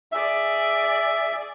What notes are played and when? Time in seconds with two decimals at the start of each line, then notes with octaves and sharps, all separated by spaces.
0.12 G#4 D5 E5